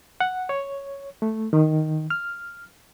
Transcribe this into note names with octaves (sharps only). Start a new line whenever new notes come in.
F#5
C#5
A3
D#3
F6